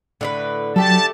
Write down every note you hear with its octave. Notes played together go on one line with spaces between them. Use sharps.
A2 D3 F4 B4
F#3 A3 G4 A4 A5